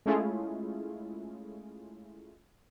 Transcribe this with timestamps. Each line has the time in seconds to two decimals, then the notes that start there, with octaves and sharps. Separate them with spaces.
0.06 G#3 A3 C#4 E4 F4 G#4